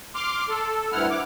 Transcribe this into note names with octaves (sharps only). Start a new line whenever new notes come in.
C6 D6 F6
A4
D2 G2 E4 F#5 F6
D6